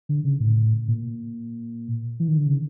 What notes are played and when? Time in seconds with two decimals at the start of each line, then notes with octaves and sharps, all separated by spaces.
0.09 D3
0.24 C#3
0.40 A2
0.88 A#2
2.20 E3
2.28 D#3
2.37 D3
2.46 C#3